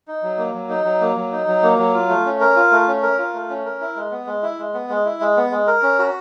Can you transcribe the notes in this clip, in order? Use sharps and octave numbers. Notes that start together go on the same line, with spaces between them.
D#4
F#3
A#3
F#3
D#4
F#3
A#3
F#3
D#4
F#3
A#3
F#3
F4
A3
C#4
A#4
F4
A3
C#4
A#4
F4
A3
C#4
A#4
E4
G#3
B3
G#3
E4
G#3
B3
G#3
E4
G#3
B3
G#3
A#4
C#4
F#4